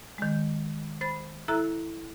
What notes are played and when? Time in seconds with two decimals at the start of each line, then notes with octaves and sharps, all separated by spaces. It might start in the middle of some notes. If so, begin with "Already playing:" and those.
0.18 D#3 G#3
1.01 C5 B5 A6
1.48 E4 A4 E5 A#5 E6 F#6